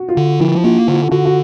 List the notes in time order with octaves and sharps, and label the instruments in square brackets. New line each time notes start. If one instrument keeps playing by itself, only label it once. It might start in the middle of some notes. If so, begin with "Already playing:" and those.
Already playing: [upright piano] F#4
F4
[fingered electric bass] D3
[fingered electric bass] F3 [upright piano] E4
[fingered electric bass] A#3 [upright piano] F4
[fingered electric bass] D3 [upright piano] F4
[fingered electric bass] D3 [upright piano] F#4
[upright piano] F#4